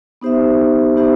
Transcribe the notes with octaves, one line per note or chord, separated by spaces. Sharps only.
B3 D#4 G4 C5 E5
B3 D#4 G4 C5 E5